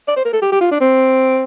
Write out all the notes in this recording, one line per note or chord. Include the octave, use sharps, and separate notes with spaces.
D5
C5
A#4
A4
G4
G4
F4
D4
C4